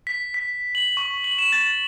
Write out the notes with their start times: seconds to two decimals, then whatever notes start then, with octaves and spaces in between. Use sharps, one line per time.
0.07 B6
0.34 B6
0.75 F#7
0.97 C#6
1.24 F#7
1.38 E7
1.52 A6